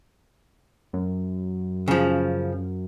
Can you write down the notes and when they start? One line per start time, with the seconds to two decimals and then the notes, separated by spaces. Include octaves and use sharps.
0.93 F#2
1.88 C#3 F3